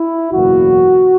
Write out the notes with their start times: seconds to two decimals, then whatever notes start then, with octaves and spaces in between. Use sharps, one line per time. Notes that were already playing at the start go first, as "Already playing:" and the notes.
Already playing: E4
0.32 F#1 E2 B2 F#3 A#3 F#4